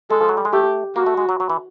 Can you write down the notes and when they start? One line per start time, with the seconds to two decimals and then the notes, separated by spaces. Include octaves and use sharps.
0.10 G#3 A4
0.21 F3
0.29 F#3
0.37 G3
0.45 G#3
0.53 A3 G4
0.96 A#3 F#4
1.06 A3
1.17 G#3
1.29 F#3
1.40 F#3
1.50 E3